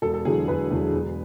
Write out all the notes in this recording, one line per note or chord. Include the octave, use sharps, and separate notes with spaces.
E1 A4
A4
E2 D3 F#3 G#4
E1 B4
E2 D3 F#3
E1